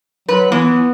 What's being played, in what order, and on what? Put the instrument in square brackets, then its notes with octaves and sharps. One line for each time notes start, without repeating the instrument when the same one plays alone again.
[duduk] F#3 [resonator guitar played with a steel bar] B4
[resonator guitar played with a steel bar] E3 [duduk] B3